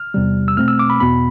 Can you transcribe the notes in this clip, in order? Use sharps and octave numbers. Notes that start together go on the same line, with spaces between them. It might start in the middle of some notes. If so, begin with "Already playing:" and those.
Already playing: F6
E2 C3 G3
E6
B2 A3 C4 F6
E6
D6
B5
E2 B2 B3 B5